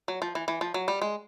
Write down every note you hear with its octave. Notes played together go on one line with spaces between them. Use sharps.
F#3
F3
E3
E3
F3
F#3
G3
G#3